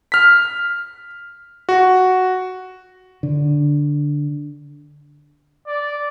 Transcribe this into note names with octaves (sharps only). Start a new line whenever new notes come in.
F6 B6
F#4
D3
D5